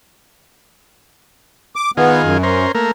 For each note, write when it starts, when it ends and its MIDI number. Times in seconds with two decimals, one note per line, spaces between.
1.76 1.91 86
1.97 2.38 51
1.97 2.22 59
1.97 2.38 65
1.97 2.38 68
2.24 2.66 42
2.43 2.72 61
2.43 2.72 70
2.43 2.72 72
2.75 2.91 57
2.75 2.91 58
2.75 2.91 70